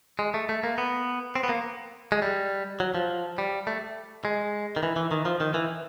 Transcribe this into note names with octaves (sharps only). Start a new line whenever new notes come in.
G#3
A3
A3
A#3
B3
C4
B3
A#3
G#3
G3
F#3
F3
G3
A3
G#3
D#3
E3
E3
D#3
F3
D#3
E3